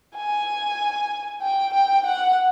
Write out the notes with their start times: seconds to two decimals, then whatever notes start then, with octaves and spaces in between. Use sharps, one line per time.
0.16 G#5
1.42 G5
1.74 G5
2.06 F#5